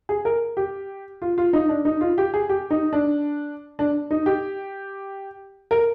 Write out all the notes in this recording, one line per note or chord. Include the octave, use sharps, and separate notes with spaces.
G#4
A#4
G4
F4
F4
D#4
D4
D#4
F4
G4
G#4
G4
D#4
D4
D4
D#4
G4
A#4